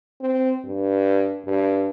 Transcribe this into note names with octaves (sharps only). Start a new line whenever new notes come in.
C4
G2
G2